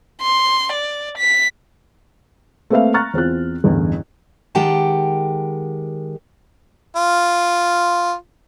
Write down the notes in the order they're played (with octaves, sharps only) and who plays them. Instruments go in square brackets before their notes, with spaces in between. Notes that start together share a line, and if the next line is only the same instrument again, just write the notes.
[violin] C6
D5
B6
[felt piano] A3 A#3 C4 B4 E5 F5
A#5 C#6 F6 F#6 A6
E2 C4 F4 F#6
A1 E2 G2 D3
[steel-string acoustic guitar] D#3 G#3 G4 F#5 G5 A5
[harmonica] F4